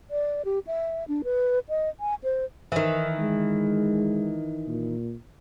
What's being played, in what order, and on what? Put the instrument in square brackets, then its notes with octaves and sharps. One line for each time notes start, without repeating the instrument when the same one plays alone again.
[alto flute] D5
G4
E5
D4
B4
D#5
G#5
C5
[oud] D#3 E3
[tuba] G#3
A#2